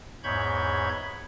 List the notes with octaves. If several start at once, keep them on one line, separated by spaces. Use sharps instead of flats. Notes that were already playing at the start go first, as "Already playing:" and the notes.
E2 G#2 C#5 B5 G6 G#6